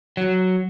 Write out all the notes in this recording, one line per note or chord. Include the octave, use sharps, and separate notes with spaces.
F#3